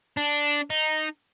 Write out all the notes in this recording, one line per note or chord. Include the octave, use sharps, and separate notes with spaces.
D4
D#4